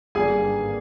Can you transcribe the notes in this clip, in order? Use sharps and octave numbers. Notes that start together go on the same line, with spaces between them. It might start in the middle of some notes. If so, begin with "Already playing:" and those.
G#1 G2 D3 G3 A#3 G#4 G#5